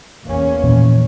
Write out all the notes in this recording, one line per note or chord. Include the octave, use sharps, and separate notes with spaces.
E2 A#3 C#4
A#2 E3 F3